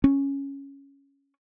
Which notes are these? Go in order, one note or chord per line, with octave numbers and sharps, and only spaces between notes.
C#4